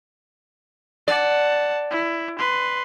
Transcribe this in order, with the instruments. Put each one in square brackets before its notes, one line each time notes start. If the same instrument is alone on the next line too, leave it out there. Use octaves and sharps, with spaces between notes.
[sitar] D5 [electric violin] F#5 A5
[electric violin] E4
B4 C6